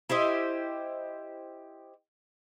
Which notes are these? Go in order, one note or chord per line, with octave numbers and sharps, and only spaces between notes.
E4 G4 C5 D#5